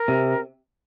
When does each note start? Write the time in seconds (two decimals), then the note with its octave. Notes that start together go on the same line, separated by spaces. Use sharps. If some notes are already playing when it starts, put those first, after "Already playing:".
Already playing: A#4
0.08 C3